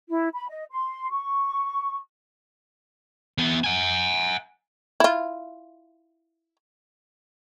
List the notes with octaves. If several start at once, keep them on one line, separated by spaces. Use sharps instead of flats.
E4
B5
D#5
C6
C#6
E2 B3
F#5 G#5
E4 F4